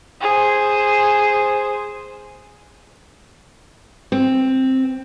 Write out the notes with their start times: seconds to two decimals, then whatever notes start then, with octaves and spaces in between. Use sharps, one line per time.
0.22 G#4 C5
4.12 C4